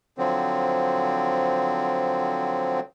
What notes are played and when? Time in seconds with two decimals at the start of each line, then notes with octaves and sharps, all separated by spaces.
0.18 D3 F3 F#3 C4